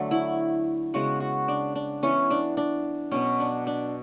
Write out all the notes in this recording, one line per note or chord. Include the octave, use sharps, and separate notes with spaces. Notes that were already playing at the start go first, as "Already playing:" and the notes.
Already playing: D3 F#3 A3
E4
C#3 G#3 B3 F#4
F#4
D4
D4
E3 B3 C#4
D4
D4
B2 F#3 B3 C#4
D4
D4